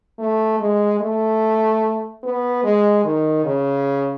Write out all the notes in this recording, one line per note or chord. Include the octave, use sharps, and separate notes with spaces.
A3
G#3
A3
B3
G#3
D#3
C#3